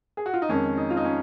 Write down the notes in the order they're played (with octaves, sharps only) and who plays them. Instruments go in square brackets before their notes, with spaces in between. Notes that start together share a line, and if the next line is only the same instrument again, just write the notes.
[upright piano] G#4
F#4
F4
D#4
F2 D#3 G#3 C#4
D#4
F4
D#4
C#4